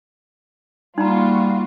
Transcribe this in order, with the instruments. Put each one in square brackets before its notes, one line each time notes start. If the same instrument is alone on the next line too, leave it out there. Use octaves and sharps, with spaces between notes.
[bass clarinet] G3 [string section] A#3 F4 F#4 [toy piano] D#4 A#5